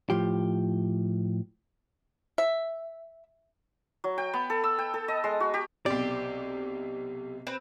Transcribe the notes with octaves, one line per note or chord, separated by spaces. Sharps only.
A2 F3 G4
E5
F#3
G5
B3
A4
E6
G5
A4
D#5
G#3
F#4
G4
B1 C3 G4 D5
C4 B4